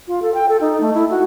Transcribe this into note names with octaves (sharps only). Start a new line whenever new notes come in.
F4
A4
G5
A4
D#4
A3
E4
F#4